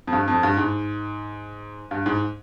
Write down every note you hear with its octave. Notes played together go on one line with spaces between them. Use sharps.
F2
G2
F2
G2
G#2
G2
G#2